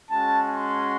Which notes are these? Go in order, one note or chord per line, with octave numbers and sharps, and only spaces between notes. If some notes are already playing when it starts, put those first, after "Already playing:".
G#3 C#4 F#4 A5
C6